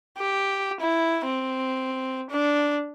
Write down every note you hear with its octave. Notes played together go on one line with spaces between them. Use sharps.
G4
E4
C4
D4